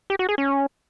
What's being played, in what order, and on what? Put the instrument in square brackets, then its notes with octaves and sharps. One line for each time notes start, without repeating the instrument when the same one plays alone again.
[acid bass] G4
F#4
G#4
C#4